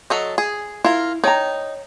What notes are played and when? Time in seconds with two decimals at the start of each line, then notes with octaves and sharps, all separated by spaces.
0.10 F#3 A4 D#5
0.38 G#4
0.85 E4 F4 A#4
1.24 D#4 C#5 G5 A#5